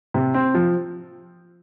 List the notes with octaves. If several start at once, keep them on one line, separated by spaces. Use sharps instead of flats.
C3
C4
F3